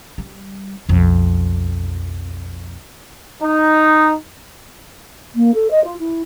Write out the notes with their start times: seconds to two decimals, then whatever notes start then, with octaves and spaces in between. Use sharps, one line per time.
0.18 G3
0.89 B1 F2
3.42 D#4
5.35 A#3
5.54 A4
5.70 D#5
5.84 F4
5.98 E4